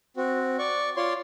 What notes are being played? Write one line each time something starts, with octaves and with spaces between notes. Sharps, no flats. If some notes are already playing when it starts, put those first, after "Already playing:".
C4 F#4
D5 C#6
F4 C#5 D5 C6